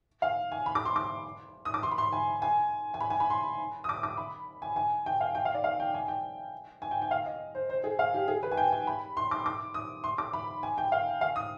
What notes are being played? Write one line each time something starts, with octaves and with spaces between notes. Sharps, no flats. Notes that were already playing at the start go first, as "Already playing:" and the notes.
F5
G#5
B5
D6
C6
D6
D#6
D6
C6
B5
C6
G#5
G#5
G#5
B5
G#5
B5
C6
D#6
D6
D6
B5
G#5
G#5
G5
F5
G5
F5
D5
F5
G5
G#5
G5
G#5
G5
G5
F5
D#5
C5
C5
G#4
F5
G4
G#4
B4
G#5
G5
G#5
B5
C6
D6
D6
D#6
C6
D6
B5
G#5
G5
F5
F5
D#6